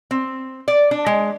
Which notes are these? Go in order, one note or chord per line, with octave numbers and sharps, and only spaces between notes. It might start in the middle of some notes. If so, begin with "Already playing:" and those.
C4
D5
D4
G#3